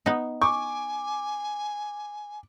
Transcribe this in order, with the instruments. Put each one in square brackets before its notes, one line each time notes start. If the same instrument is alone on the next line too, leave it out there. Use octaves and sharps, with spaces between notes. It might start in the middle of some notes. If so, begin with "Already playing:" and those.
[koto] B3 D#4
[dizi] G#5 [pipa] C#6 [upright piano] D6